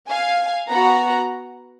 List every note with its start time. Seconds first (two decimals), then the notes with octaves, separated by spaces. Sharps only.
0.09 F5 G#5
0.69 B3 F#4 F#5 A#5